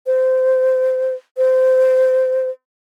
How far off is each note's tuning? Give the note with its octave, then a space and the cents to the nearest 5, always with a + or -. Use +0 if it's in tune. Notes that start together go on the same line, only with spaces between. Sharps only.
C5 -20
C5 -20